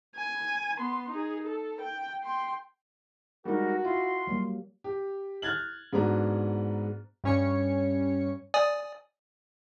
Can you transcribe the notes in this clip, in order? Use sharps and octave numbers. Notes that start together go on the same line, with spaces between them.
G#5
B3 C6
D#4 G#4
A4
G5
G5 C6
G3 G#3 D#4 F#4 A#4
E4 F4 C6
F#3 G3 A#3
G4
F6 F#6 G#6 A6 F#7
G#2 B3 D4 F#4 A#5
G2 G3 C#4 C#5 G#5 C#7
D5 G#5 D#6